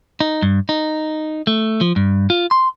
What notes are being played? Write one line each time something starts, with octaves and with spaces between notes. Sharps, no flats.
D#4
G2
D#4
A3
F3
G2
F4
C6